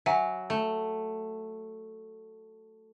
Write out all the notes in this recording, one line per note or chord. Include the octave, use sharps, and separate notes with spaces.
F#3 E5 F#5 G#5
A3